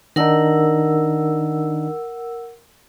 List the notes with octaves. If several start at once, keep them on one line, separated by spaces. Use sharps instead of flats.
D#3 D4 D#4 A#4 F#5 E6